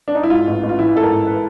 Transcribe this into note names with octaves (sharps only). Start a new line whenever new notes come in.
D4
D#4
E4
G#2 F4
A1
A1
F4
E3 E4
G#2 A4
A#4
A1
B4